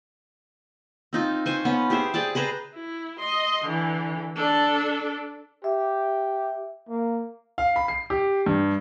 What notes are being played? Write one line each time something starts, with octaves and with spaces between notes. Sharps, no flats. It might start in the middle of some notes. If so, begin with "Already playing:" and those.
C4 D#4 F4
C5 G#5 C#6
B3 C#4
G4 G#4 C5 E5
G#4 D5 G5 A5
G#4 B4 C5 A#5
E4
D#5 C6
D3 E3
D4 A4
G4 E5
A#3
F5
B5
C7
G4
G2